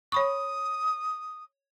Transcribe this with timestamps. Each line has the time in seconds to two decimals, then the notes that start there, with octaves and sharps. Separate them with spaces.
0.12 C#5 B5 C#6 D#6